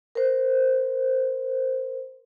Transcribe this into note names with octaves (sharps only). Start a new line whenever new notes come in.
A#4 C5